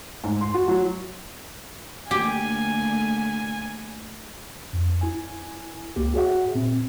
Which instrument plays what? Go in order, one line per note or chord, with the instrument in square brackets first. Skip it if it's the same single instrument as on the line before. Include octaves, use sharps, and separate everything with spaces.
[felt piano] G#2
C6
F#4
F#3
[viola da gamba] D3 A3 A#3 [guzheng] G4 [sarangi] G#5
[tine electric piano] F2
E4 G#5
C#2 A#3 G4
F#4 G#4 C#5 E5 F#5
A#2 C4